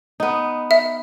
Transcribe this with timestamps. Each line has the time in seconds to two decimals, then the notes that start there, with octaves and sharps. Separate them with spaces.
0.20 B3 D#4
0.71 E5